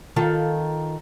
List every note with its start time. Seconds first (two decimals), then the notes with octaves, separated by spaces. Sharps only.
0.16 D#3 F4 A4